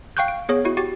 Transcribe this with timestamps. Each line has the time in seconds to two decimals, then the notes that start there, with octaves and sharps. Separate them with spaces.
0.17 F5 G5 C#6 F#6 G6
0.28 D7
0.49 B3 G#4 C#5
0.65 E4 F#4
0.77 F#4 G4 A6